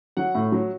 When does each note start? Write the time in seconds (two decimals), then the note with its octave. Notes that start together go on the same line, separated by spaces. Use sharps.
0.17 F#3 F#5
0.35 A2
0.52 F#3